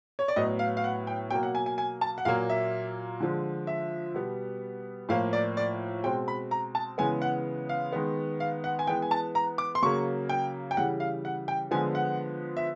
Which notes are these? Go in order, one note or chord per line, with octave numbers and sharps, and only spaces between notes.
C#5
D5
A2 F#3 B3 D#5
F5
F5
F#5
G5
B2 F#3 A#3 G5
F#5
G#5
G#5
G#5
A5
F#5
A#2 F#3 A#3 F5
E5
D3 F3 G#3
E5
B2 G3 B3
A2 F3 A#3 F5
D5
D5
B2 G#3 C4 G5
B5
A#5
A5
C#3 E3 G#3 B3 G#5
F#5
F5
D#3 G#3 B3
F5
F#5
G#5
E3 G#3 B3 G5
G#5
A5
A#5
D6
C6
C#3 F#3 A#3 C#6
G5
G5
C#3 E3 G3 F#5
F5
F#5
G5
D3 F3 G#3 B3 G#5
F#5
E5